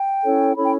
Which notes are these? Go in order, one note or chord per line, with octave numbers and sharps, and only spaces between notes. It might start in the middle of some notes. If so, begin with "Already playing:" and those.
Already playing: G5
C#4 E4 A4 C#5
C#4 E4 A4 C#5 B5
G5